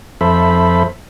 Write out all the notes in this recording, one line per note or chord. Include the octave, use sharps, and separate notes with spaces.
F2 A4 C5 E5 B5